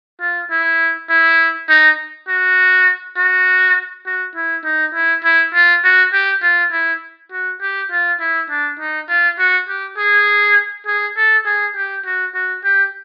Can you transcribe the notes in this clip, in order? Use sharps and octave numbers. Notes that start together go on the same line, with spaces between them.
F4
E4
E4
D#4
F#4
F#4
F#4
E4
D#4
E4
E4
F4
F#4
G4
F4
E4
F#4
G4
F4
E4
D4
D#4
F4
F#4
G4
G#4
G#4
A4
G#4
G4
F#4
F#4
G4